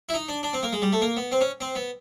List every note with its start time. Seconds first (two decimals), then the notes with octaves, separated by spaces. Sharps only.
0.09 E4
0.14 D#4
0.29 D4
0.43 D4
0.53 C4
0.63 A#3
0.73 G#3
0.82 G3
0.93 A3
1.02 A#3
1.17 B3
1.32 C4
1.41 C#4
1.61 C4
1.75 B3